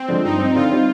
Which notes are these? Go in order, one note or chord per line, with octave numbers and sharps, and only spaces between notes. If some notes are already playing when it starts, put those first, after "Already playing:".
Already playing: C4
D3 F3 G#3
G2 D#4
F3 C4
D3 F4
G3 C4 D#4